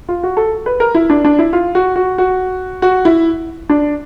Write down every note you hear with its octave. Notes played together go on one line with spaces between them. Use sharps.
F4
F#4
A4
B4
A#4
E4
D4
D4
E4
F4
F#4
F#4
F#4
F#4
E4
D4